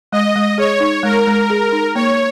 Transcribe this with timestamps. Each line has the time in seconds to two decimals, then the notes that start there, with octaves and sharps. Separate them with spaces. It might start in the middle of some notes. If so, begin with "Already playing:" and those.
0.12 G#3 D#5
0.36 G#3
0.58 G#4 C#5
0.80 D#4
1.03 G#3 A#4
1.27 G#3
1.50 G#4
1.72 D#4
1.95 A#3 C#5